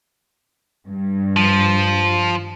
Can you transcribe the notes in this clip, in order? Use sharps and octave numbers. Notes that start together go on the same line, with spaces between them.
G2
F3